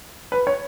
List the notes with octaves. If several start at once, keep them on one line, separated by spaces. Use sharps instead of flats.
B4
C#5